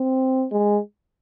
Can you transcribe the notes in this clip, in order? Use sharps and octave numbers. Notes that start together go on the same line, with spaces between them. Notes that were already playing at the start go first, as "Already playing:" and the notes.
Already playing: C4
G#3